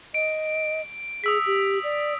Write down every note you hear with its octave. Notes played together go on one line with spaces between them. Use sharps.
D#5 D7
G#4 D#6 E6 B6
G4
D5